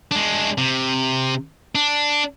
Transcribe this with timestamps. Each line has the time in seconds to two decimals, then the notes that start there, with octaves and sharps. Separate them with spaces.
0.11 G#3 D4
0.58 C3
1.75 D4